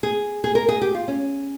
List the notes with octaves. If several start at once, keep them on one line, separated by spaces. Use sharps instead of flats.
G#4
G#4
A#4
G#4
G4
F4
C#4